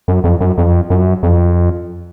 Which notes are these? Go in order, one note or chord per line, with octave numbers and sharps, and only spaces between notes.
F#2
F2
F#2
F2
F#2
F2